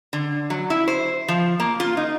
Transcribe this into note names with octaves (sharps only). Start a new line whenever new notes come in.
D3
F#3
E4
C5
F3
A#3
F4
D#4